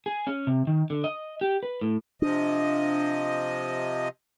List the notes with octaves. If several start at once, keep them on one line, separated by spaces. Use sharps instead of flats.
G#4
C#4
C3
D#3
D3
D#5
G4
B4
A2
C3 F3 D4 D#5